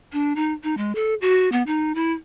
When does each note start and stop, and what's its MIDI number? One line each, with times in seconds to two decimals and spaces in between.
0.13 0.33 62
0.36 0.52 63
0.63 0.77 63
0.77 0.92 56
0.95 1.14 69
1.21 1.51 66
1.52 1.63 59
1.66 1.94 63
1.95 2.12 64